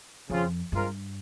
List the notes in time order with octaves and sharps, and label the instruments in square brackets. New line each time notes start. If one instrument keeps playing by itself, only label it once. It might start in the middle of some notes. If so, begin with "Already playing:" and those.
[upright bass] F2 [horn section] C#3 F3 C4 F4 G#4
[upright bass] G2 [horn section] G#3 C4 F4 A#4